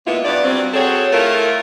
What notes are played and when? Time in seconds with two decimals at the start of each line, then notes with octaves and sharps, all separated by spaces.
0.06 A#2 G#3 B3 E4 F4
0.25 G2 B3 D5
0.43 F#3 G3 C4
0.74 C4 F#4 G#4 A4 C#5
1.12 A3 E4 F4 A4 A#4